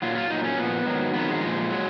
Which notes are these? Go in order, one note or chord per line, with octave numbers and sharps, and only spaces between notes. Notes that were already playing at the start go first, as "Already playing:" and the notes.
A#2 F#3 F4
F4
A#2 F#3 D#4
C#4
A#2 F3 B3
G#2 D#3 F#3
F2 D#3 F#3 B3
G#3
A#2 F3
F#3